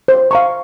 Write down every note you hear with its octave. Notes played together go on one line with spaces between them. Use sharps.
C5
F5 A#5 C#6